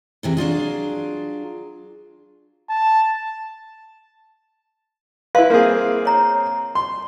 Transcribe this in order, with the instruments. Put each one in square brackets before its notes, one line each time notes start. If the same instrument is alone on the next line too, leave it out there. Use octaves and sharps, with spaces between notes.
[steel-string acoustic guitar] G#2 C3 E3
F#3 D4 F4 G#4
[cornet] A5
[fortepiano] E4 B4 [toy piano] F5 C6
[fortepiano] A#3 C4 G#4
[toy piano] C#5 A#5
[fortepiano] C6